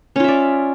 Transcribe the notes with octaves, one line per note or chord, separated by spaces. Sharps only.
C#4 F4 D5 E5